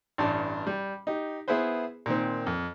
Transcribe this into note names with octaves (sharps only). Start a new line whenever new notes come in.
A1 G2 D5 A5
G3
D#4 G4
B3 E4 G#4 B4 C5
A#2 D#3 C4
F2